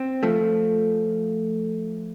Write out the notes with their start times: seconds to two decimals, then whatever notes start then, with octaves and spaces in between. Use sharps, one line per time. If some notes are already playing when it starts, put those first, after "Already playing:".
Already playing: C4
0.23 F3 A3